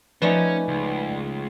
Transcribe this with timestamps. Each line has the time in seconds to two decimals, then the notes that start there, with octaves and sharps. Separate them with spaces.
0.22 F3 A3 C#4 D#4 B4 D5 G#5
0.68 C#2